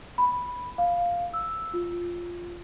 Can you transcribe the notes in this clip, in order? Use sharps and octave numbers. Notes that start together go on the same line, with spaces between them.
B5
F5
E6
F4